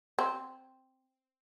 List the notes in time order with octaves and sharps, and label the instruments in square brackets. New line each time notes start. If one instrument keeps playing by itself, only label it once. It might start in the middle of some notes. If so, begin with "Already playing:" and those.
[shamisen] C4